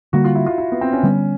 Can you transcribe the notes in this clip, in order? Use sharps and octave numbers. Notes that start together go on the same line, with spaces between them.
D3 G3 A#3 F#4
F4
E4
F4
E4
B3
C4
C#4
D3 G3 B3